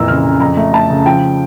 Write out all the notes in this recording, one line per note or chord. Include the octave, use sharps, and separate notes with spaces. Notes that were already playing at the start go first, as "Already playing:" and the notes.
Already playing: F2 A#2 E3 A#5 E6
C#3 F6
C#3
F2 A#5
A3
A3 A5
C#3
F3 G5